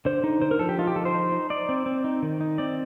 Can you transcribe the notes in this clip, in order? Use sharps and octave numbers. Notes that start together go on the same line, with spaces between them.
D3 C5
D#4
D3 C5
A#4
F3 A4
G4
D#4 F4
G4
F3 A4
C5
D#4
D#4
D#4 D5
C4
C4
D#4
D#3
D#4
C4 D5